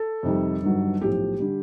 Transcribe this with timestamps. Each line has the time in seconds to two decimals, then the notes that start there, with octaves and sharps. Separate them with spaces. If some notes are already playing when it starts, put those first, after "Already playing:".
Already playing: A4
0.23 F2 C3 D#3 G3
0.63 G1 G2 D#3 F#3
1.01 B1 A2 F3 G4
1.40 D3 G3